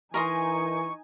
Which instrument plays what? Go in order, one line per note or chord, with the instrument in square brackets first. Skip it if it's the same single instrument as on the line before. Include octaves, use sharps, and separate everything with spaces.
[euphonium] E3 [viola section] D#4 G#5 [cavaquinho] A#4 D#5 C6 [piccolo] C#6